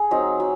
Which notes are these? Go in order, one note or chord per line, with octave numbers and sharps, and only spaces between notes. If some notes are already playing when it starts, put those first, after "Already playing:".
Already playing: G#4
F#3 C4 D#4
F#3